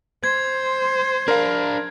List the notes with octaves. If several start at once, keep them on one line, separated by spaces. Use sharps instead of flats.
C5 G#6
D4 A#4 F5